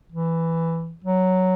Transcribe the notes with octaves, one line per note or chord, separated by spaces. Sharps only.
E3
F#3